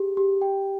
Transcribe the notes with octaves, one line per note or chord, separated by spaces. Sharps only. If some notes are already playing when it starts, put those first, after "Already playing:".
Already playing: G4 G#4
G4
G5